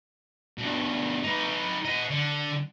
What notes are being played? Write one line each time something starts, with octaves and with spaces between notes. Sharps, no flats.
G2 B2
D#4 B4
D#5 F#5
D3